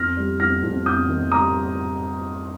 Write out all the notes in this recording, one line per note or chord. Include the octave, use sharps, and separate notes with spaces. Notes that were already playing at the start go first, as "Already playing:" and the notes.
Already playing: F2 F6 A#6
G3
F2 F6 A#6
F2
F2 D#6 G6
D#3
G3 A#5 D#6